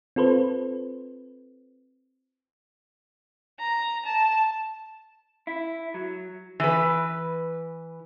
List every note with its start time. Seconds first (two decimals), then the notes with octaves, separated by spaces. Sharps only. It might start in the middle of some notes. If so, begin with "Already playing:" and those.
0.16 C4 F4 A4 B4 C5
3.60 A#5
4.05 A5
5.47 E4
5.94 F#3
6.60 E3 B4